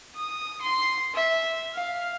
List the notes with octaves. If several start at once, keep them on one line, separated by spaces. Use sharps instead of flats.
D#6
C6
E5
F5